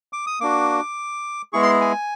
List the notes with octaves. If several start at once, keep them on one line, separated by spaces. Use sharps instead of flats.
D6
D#6
A#3 D4 F#4 D6
G#3 B3 E4 G#4 C#6
C6
G#5